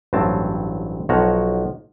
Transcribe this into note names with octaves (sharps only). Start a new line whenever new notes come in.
A1 G2 F#3 C4 A5
B1 F3 F#4 C#5 A#5